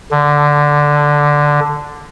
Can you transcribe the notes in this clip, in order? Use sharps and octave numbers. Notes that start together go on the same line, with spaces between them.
D3